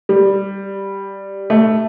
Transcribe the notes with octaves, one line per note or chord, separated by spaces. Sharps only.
G3
A3